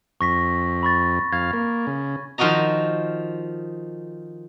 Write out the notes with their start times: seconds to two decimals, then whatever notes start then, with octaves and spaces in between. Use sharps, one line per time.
0.21 F2 C#6 A#6 B6
0.83 B5 C#6 A6
1.33 F2 F5 G#6
1.53 A#3
1.87 C#3
2.38 D#3 F3 F4 F#4 D#5 A#5